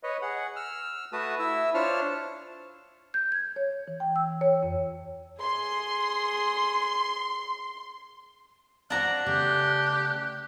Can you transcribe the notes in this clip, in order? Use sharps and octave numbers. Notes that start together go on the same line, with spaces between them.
B4 C#5 D#5
G#4 F#5
E6 F6
A3 F#4 B4 A5 D#6
E4 E5 E6
D4 F4 C5 C#5 A5 F6
G6
G#6
C#5
E3
G5
E6
C#5
F2
G#4 C6
F#3 C4 D4 F#4 A#5 F#6
C#3 A3 B3 G4